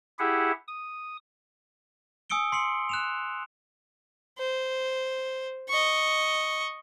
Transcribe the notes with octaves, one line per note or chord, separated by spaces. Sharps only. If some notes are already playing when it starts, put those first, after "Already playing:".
E4 G4 G#4 E5 F#5
D#6
G#5 D#6 E6 C#7 D7 G7
C6 C7 C#7 F#7
F#6 E7 F7
C5
D#5 C#6